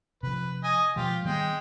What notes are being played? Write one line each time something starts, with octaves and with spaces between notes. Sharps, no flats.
C3 F3 B4
D#5 G#5
B2 F3 G#3 F4 G4
D#3 G3 G#3 B3 G5